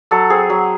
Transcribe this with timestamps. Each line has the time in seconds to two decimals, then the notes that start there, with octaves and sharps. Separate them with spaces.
0.11 F#3 A4
0.30 C4 G#4
0.50 F#3